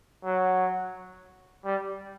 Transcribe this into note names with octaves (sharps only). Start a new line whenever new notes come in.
F#3
G3